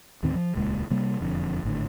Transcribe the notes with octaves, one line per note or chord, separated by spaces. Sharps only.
D#2 A2 D#3 C4
F3
D#1 C#2 A#2 G#3
C3 G3 A#3
E1 F2 D3
G#1 A2 D3